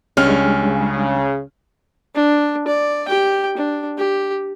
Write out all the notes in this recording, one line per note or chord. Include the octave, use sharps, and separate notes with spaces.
C#2 G3 G#3 C#4 D4 F6
C#3
D4
D5
G4 G5
D4
G4